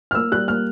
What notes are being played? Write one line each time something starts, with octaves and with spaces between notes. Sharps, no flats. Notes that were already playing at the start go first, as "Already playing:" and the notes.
F6
A#3 E6
G3 F#6
A#3 F6